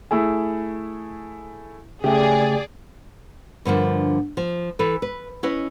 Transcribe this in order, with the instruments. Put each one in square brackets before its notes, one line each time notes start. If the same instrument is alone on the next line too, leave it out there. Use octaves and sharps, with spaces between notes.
[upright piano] A3 E4 G#4
[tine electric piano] C#3 A3 [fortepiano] G4 [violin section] G#4 D5
[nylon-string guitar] G2 D3 F3 A#3
F3
E3 A4 B4
B4
C#4 E4 B4 D#5